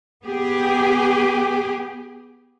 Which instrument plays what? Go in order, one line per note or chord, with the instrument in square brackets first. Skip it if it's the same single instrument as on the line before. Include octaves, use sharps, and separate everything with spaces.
[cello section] B3 G4 G#4